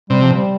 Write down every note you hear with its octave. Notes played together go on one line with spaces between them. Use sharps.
C3 G3
F3
G3